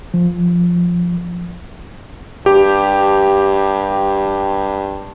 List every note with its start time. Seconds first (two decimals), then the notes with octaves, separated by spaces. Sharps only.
0.14 F3
2.46 G2 G4